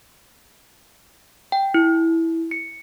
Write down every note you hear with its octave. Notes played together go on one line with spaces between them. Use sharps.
G5
E4
C#7